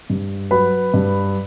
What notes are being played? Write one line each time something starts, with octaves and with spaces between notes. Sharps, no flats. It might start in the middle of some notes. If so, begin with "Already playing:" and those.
G2
F#3 B4 B5
G2